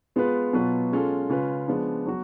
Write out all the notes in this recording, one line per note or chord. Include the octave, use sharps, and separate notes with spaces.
G#3 B3 F4 B4
B2 F#3 B3 F4 B4
G#3 C#4 F4 A4
C#3 G#3 C#4 F4 B4
F3 G#3 B3 D4
F#3 B3 F#4